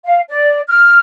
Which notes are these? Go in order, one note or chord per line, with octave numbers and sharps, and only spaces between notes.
F5
D5
F6